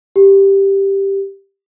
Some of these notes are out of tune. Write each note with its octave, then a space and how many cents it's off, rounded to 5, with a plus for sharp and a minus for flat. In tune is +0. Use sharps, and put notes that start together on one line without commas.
G4 +0